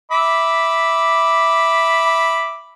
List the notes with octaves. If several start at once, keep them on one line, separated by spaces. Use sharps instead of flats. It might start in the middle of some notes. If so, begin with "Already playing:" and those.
E5 B5 D6